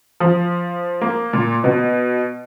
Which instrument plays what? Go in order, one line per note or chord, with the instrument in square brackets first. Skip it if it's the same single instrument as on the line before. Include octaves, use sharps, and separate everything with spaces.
[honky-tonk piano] F3
A#3
A#2
B2